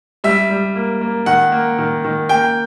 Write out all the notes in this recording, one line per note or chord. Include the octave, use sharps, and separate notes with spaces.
G3 E5
G3
A#3
A#3
D#3 F#5
A#3
D#3
D#3
A#3 G5